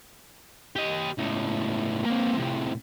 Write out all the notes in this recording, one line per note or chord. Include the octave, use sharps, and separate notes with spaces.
G4 D#5
C#2 A2
A#3 C4
A2 C3